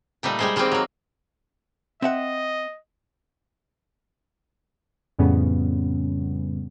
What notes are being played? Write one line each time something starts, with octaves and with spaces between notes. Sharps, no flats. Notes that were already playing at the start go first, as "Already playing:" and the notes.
A#2 G3 A3 D#4
G3 G#3 C5
D#3 G3 G#3 A#3 C4
F#3 A#3
C4 D#5 E5 F#5
F2 A2 C#3 G3 B3 C#4